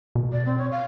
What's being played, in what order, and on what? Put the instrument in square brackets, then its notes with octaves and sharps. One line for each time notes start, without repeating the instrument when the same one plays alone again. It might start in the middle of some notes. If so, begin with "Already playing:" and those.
[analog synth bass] B2
[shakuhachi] D5
C4
C#5
F5